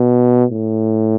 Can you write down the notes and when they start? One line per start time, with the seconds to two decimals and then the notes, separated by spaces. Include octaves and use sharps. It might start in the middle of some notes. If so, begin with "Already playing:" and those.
Already playing: B2
0.51 A2